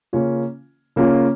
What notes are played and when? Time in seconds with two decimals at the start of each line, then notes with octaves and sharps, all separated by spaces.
0.13 C#3 A#3 C#4 F4
0.96 C#3 A#3 C#4 F4